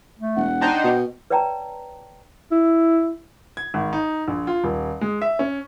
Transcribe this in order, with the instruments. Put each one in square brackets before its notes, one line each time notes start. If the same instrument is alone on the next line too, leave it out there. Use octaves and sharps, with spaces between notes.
[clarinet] A3
[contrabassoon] E1 [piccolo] F#5
[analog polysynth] D4 D#4 C5 [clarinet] G5
[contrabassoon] B2
[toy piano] B4 C#5 D5 G5 A5 A#5
[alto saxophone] E4
[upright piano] G#6
G#1
D#4
A#1
F4
D#1
G#3
E5
C#4